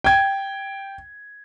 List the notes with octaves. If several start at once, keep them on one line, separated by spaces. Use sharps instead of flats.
G5 G#6